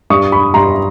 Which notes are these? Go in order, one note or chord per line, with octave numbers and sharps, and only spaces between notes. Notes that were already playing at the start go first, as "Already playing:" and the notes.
G2 C#6 D#6
B5 C#6
G2 A#5 C6